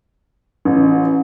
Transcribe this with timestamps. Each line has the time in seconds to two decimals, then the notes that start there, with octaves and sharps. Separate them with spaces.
0.65 A1